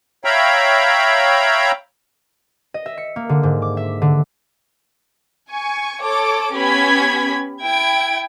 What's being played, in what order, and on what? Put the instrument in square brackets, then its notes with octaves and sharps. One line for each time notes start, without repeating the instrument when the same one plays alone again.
[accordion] C#5 E5 F5 G5 A#5 B5
[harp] D#5
E5
C#7
A#3
D3
G#2
D6
E5
D3
[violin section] G#5 C#6
A4 C#5 D6
B3 C#4 G4 B5 G#6 B6
E4 G5 G#6 D7